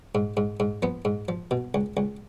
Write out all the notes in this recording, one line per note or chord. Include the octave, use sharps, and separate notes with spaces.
G#2
G#2
G#2
F3 B3
G#2
F3
B2
C#2
C#2